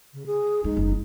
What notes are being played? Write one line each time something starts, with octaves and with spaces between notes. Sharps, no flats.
C#3
G#4
G#3 D#4
F#1
E4